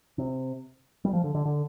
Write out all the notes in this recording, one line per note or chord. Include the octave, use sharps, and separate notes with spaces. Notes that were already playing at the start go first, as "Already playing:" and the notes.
C3
G3
F3
D3
D3
D3